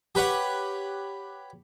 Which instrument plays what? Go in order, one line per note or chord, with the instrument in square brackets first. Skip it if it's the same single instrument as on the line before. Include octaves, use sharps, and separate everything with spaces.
[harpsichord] G4 B4 C#5 F#5